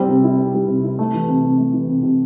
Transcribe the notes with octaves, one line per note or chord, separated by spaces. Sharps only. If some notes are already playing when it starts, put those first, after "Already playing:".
Already playing: G3 C4
C3
E4
C4
G3
C3
E4
A3
E3
C3
C3
A3
E3
C3
C3